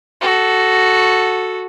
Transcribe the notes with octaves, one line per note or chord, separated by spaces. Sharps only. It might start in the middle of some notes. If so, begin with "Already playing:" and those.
F#4 A4